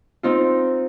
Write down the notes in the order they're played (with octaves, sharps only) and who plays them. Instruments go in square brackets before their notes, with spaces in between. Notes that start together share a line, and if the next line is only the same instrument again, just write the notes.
[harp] C4 D#4 F4